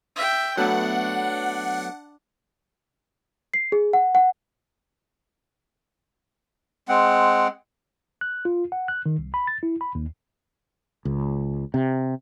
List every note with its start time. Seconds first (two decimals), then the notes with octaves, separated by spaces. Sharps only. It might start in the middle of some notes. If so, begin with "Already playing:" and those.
0.16 E5 G5
0.57 F#3 A3 B3 D4 F#5
3.54 C7
3.72 G#4
3.93 F#5
4.15 F#5
6.88 G#3 C4 F#5
8.21 F#6
8.45 F4
8.72 F#5
8.88 F#6
9.06 D#3
9.19 C2
9.34 B5
9.47 A6
9.63 E4
9.81 B5
9.95 D#2
11.05 C#2
11.74 C3